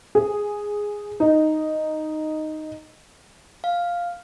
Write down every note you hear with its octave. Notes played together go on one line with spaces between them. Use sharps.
G#4
D#4
F5